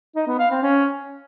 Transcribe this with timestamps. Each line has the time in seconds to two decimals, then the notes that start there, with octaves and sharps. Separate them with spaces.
0.16 D#4
0.27 B3
0.39 F5
0.51 C4
0.62 C#4